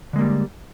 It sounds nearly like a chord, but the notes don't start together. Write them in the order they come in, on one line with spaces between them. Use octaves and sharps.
D3 G#3 A#3 G3